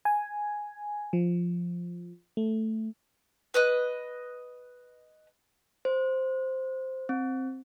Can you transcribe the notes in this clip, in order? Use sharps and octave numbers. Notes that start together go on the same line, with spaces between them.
G#5
F3
A3
B4 D#5 F#6
C5
C4